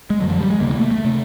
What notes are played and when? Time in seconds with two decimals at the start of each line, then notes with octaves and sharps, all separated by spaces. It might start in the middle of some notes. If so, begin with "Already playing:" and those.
0.10 G#3
0.20 F#2 D3 F#3
0.30 F3
0.40 G3
0.50 G#3
0.60 D2 C3 A#3
0.71 A#3
0.81 A3
0.91 A3
1.05 C3